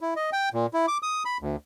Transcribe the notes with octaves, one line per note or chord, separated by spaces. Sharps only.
E4
D#5
G5
A#2
E4
D6
D#6
B5
D2